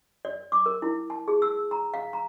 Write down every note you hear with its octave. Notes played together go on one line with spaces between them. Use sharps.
D5
D6
A#4
E4
A5
G#4
E6
A#5
F5
A#5